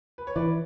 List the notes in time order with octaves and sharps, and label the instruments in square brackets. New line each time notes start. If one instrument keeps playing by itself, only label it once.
[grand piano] B4
C#5
[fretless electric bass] E3 [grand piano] B4 D5